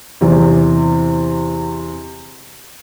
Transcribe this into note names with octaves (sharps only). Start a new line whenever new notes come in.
E2 C3